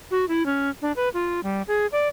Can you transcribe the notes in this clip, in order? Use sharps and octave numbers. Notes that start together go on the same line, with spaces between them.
F#4
E4
C#4
D4
B4
F4
G3
G#4
D5